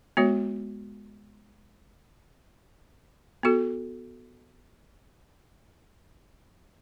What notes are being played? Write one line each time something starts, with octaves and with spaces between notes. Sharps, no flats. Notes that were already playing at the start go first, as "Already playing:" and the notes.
G#3 B3 F#4 C#5
B3 F#4 A4